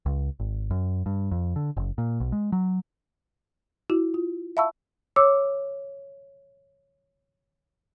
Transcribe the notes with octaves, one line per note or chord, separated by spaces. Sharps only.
C#2
G#1
F#2
G2
F2
D3
F#1
A#2
B1
G#3
F#3
E4 F#4
F4
E5 F5 A5 B5 C#6 E6
C#5 D6 E6